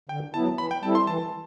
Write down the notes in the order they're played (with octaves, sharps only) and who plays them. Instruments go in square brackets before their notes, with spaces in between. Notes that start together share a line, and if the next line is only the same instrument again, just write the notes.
[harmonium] D3 [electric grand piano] G5
[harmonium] F#3 B3 E4 [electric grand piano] A5
[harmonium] E3 [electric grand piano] B5
[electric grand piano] G5
[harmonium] G3 C4 E4 A4 [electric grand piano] A5
[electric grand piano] C6
[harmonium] E3 [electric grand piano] A5